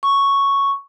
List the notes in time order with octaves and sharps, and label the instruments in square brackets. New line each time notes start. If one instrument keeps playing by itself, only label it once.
[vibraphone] C#6